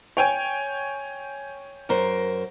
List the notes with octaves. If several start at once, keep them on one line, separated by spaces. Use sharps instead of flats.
C#5 G5 G#5
F#2 A#4 C5